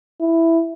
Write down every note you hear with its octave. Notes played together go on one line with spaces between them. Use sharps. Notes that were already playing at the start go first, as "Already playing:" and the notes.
E4